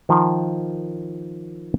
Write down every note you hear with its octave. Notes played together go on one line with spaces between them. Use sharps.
D#3 F3